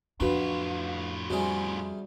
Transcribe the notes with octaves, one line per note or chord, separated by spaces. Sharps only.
F2 A2 D4 F4 F#4 B4
C3 G3 F#4 G#4